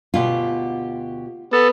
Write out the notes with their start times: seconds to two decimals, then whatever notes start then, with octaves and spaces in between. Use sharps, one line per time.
0.14 D2 B2 F4 G4
1.53 B3 A4